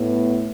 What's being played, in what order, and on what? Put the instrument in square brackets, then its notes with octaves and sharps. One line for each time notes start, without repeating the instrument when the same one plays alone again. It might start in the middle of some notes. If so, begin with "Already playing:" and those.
Already playing: [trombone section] A2 [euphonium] B3